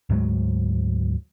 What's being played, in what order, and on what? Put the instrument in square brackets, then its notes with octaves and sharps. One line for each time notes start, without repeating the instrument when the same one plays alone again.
[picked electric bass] D2 G#2 F#3 G#3